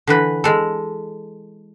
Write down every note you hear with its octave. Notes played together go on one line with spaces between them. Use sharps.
D3 E3 B4
G#3 A4